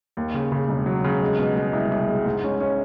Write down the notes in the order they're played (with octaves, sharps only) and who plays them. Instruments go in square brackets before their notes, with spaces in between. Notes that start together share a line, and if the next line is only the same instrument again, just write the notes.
[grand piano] D#2
C#3
C#3
E1
F#3
C#3
G#3
B2
G#3
C2
C2
G#3
G#2
C#4
C#4